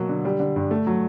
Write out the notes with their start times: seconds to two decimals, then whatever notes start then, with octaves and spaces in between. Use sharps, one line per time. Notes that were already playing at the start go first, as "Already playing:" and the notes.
Already playing: B2 F#3 A#3
0.09 D3
0.25 G3
0.40 D3
0.56 G2
0.71 A3
0.87 F#3